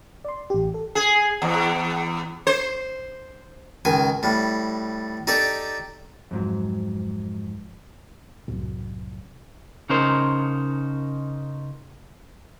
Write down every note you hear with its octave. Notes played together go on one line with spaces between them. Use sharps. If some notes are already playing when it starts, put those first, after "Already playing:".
D5 C6
A1 G4
A4
G#4
E2
C5
C#2 D#3 G#5 D#6
A2 G3
D#4 G4 A4 D5
F2 G#2 F#3
C2 F#2 A2 F#3
C#3 C#4 D#4 A#4 C5